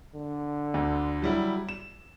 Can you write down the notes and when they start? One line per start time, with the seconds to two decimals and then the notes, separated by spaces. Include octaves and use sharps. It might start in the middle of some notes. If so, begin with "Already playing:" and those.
0.15 D3
0.74 D2
1.22 F#3 G3 E4
1.69 E7